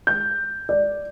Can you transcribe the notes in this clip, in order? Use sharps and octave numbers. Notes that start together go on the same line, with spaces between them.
G6
D5